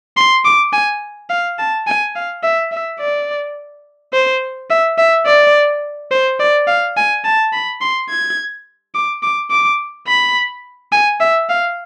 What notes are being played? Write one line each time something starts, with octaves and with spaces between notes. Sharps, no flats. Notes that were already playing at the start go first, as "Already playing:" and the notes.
C6
D6
G#5
F5
A5
G#5
F5
E5
E5
D5
C5
E5
E5
D5
C5
D5
F5
G#5
A5
B5
C6
G#6
D6
D6
D6
B5
G#5
E5
F5